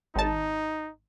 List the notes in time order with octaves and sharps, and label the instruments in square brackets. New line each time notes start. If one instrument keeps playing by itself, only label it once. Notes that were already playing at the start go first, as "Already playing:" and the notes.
[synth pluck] G#1 A5 [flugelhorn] D#4